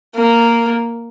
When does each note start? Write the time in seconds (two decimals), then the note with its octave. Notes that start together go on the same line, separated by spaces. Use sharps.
0.15 A#3